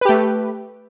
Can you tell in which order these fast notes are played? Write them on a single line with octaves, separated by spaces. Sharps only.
B4 G4 A3